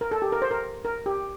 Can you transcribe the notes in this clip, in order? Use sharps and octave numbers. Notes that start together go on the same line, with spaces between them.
A#4
A4
G4
A#4
C5
A#4
A#4
G4